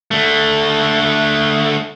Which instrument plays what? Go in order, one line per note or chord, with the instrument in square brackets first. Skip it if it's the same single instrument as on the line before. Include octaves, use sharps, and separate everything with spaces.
[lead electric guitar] D3 A3